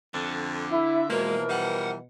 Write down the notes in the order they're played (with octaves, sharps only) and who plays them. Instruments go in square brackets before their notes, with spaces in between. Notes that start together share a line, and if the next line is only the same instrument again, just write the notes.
[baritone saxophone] F2 [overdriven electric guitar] D3
[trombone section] E4 [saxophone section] E5
[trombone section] B2 [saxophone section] E3 F3 A#4 [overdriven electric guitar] G#3 [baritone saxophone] A#3
[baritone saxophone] G3 [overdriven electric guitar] F5 F#5